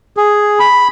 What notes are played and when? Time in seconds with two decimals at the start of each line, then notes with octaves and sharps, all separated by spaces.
0.17 G#4
0.60 B5